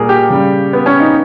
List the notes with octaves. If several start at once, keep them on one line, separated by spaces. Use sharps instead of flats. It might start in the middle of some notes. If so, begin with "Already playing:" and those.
Already playing: A#2 G3 G#4 A#4
G4
C#3 G3
B3
C#4
D#4